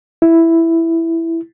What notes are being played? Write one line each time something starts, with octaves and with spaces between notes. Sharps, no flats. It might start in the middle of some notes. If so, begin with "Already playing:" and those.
E4